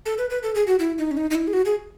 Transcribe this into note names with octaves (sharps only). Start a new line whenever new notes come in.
A4
B4
B4
A4
G#4
F#4
E4
D#4
C#4
D#4
D#4
E4
G#4
F#4
G#4